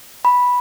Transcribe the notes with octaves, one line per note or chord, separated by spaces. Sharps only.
B5